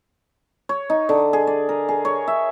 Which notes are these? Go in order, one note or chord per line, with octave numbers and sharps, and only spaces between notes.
C#5
D#4
D3
G#4
D5
A#4
G#4
C#5
E5